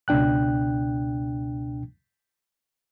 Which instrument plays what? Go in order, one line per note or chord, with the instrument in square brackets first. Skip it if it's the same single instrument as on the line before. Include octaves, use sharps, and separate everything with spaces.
[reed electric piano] C#2 B2 D4 G5 F#6